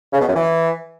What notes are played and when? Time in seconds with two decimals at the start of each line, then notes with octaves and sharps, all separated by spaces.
0.13 C#3
0.20 B2
0.28 F#2
0.35 E3